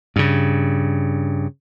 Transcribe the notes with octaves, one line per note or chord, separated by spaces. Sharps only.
G2 C#3